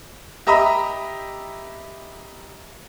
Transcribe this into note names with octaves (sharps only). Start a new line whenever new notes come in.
G4 D#5 E5 A#5 B5 D#6